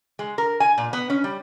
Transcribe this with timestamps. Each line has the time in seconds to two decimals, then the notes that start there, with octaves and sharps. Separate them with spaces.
0.19 G#3
0.38 A#4
0.60 G#5
0.78 A#2
0.93 B3
1.10 C#4
1.24 G3